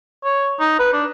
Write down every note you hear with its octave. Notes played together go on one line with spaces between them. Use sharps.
C#5
D#4
B4
D4